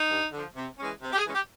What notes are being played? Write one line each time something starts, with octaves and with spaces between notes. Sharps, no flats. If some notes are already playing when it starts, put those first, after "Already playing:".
Already playing: D#4
G2
D3 F3
C3
E3 G#3 C#4
C3
G4
G#4
E3 G#3 C#4
G4